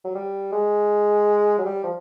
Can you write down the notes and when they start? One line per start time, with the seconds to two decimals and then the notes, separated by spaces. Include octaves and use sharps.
0.05 F#3
0.15 G3
0.52 G#3
1.58 F#3
1.66 G3
1.84 F3